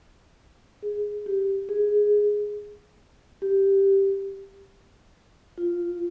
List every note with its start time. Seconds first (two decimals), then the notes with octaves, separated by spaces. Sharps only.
0.83 G#4
1.26 G4
1.69 G#4
3.42 G4
5.58 F4